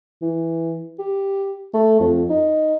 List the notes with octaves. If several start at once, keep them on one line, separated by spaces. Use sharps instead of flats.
E3
G4
A3
F2
D#4